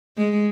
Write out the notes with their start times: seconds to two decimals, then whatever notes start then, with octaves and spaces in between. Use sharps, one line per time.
0.17 G#3